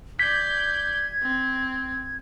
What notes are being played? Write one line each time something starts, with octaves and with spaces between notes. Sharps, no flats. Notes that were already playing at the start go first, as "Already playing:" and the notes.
D5 G6 G#6 B6
C4